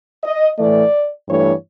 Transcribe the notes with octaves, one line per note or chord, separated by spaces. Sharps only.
D#5
A2 E3 A3 D5
G2 E3 A3 C#5